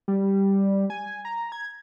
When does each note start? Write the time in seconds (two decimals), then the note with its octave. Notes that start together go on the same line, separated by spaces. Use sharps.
0.08 G3
0.90 G#5
1.25 A#5
1.52 G#6